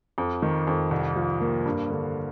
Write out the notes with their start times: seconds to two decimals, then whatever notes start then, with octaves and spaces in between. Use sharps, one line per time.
0.18 F2
0.42 D#3
0.67 F2
0.91 C2
1.16 F3
1.41 A#3
1.65 G2
1.90 D3